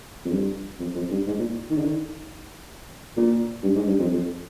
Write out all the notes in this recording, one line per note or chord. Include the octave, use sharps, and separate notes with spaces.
F2
G2
F2
F2
G2
G#2
A#2
D#3
D3
D#3
A#2
G2
G#2
G2
F2
F2